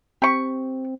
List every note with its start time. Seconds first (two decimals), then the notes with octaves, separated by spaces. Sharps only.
0.22 C4 G4 C#6